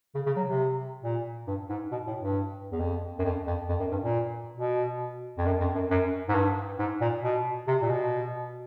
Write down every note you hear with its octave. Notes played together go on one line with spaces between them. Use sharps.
C#3
C#3
F#3
C3
A#2
G2
G#2
B2
A2
G2
E2
F2
F#2
F2
F2
F2
F#2
G2
A#2
B2
F2
F#2
F2
F#2
F#2
G#2
G2
G#2
A#2
B2
C3
A#2
B2